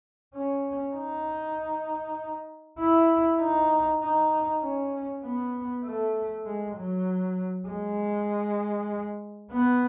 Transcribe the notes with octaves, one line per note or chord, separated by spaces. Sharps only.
C#4
D#4
E4
D#4
D#4
C#4
B3
A3
G#3
F#3
G#3
B3